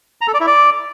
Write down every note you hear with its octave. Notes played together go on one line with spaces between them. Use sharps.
A#5
A4
D5
E4
D5